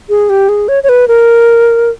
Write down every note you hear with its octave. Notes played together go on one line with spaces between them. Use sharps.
G#4
G4
G#4
C#5
C#5
B4
A#4